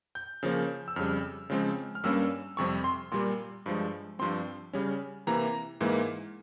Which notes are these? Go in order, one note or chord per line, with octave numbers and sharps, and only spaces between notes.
G6
C#3 F3 A#3 C#4
E6
F2 C#3 G3 F6
C#3 F3 G#3 C4
F6
G2 G3 A#3 C#4 E6
F2 C3 G3 C4 C#6
C6
A#2 G3 A#3 C6
G2 F3 G#3
G2 F3 C4 C6
C#3 G3 C#4
C3 E3 A#3 A#5
G#2 E3 A#3